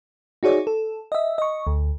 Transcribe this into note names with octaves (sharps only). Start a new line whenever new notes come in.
D#4 F#4 G#4 C#5 D5
A4
D#5 E5
D#5 C#6
D2